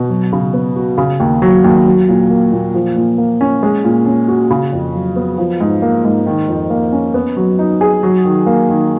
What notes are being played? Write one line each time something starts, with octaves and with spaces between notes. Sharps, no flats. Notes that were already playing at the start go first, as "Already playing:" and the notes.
Already playing: B2
F#3
C#3
B3
F#4
C#3
D#2
F#3
D#2
F#3
A#2
A#3
A#2
F3
A#2
A#3
C#4
G#3
A#2
C#4
F#4
C#3
F2
F#3
B3
F3
G#2
A#3
G#2
D#3
F2
A#3
C#4
B3
F#3
D#4
G#4
F#3
D#3
A#3
D#3